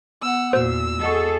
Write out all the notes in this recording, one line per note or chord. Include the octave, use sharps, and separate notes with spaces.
B3 F#5 E6
E2 A#2 F#4 C5 E6
G#4 A4 D#5 F#5 C#6